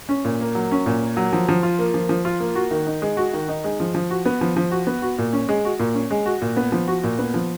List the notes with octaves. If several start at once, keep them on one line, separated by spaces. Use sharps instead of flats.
C#4
A#2
A#3
F#3
C#4
A#2
A#3
F#3
F3
F3
F4
A#3
F3
F3
F4
A#3
F#4
D#3
D#4
G#3
F#4
D#3
D#4
G#3
F3
F3
F#4
B3
F3
F3
F#4
B3
F#4
A#2
C#4
G#3
F#4
A#2
C#4
G#3
F#4
A#2
B3
F3
F#4
A#2
B3
F3